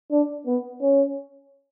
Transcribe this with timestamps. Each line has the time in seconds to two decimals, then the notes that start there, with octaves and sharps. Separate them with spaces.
0.11 D4
0.46 B3
0.82 C#4